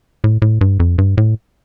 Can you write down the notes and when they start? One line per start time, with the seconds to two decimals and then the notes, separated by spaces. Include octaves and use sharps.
0.24 A2
0.42 A2
0.61 G2
0.80 F2
0.98 G2
1.18 A2